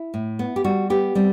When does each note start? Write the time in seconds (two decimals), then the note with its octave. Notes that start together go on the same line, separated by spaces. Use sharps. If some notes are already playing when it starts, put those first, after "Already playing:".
Already playing: E4
0.14 A2
0.39 B3
0.56 G4
0.64 G3 F#4
0.90 B3 G4
1.15 G3 C4